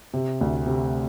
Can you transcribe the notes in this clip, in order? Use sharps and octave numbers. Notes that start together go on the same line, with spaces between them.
C3
D2
C3